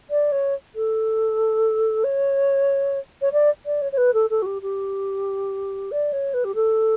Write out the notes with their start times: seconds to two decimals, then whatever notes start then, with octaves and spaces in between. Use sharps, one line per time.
0.10 D5
0.32 C#5
0.75 A4
2.04 C#5
3.21 C#5
3.32 D5
3.66 D5
3.81 C#5
3.92 C#5
3.97 B4
4.13 A4
4.30 A4
4.42 F#4
4.46 G4
4.62 G4
5.91 D5
6.12 C#5
6.34 B4
6.44 G4
6.55 A4